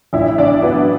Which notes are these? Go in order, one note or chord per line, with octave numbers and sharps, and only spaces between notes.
A1 E4 E5
A1 D4 D5
F#3 B3 B4